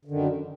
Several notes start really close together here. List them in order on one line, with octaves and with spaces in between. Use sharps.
D3 D#3 F#2